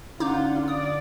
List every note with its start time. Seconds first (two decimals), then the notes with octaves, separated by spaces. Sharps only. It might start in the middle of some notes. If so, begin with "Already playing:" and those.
0.20 D3 C#4 D#4 F4 F#5 D6 G6
0.68 D5 D#6